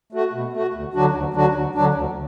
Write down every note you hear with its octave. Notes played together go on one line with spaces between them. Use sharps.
A3 F#4
B2
A3 F#4
D2
D3 F#3 D4 F#4
D2
D3 F#3 D4 F#4
D2
D3 F#3 D4
D2